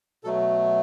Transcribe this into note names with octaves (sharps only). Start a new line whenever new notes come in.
B2 F#3 A3 A4